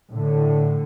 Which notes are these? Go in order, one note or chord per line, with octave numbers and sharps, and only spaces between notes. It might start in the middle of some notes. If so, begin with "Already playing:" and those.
A2 D3